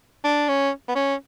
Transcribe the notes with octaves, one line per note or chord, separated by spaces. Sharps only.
D4
C#4
B3
C#4